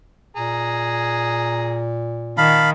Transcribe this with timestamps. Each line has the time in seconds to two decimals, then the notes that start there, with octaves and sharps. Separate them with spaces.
0.37 A#2 G#4 A#5
2.38 D#3 F5 A5 B5